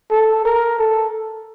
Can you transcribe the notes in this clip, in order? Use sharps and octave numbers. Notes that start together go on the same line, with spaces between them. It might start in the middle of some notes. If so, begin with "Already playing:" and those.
A4
A#4
A4